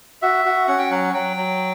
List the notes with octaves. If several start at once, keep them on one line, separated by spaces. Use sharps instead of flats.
F#4 E5
F#4
C#4 F#5
G5
F#3 F#5
F#3 G5
F#3